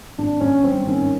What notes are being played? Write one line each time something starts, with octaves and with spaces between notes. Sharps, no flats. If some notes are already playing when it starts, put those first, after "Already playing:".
G#1 D4
G#1 C#4
G2 C4
D#3 C#4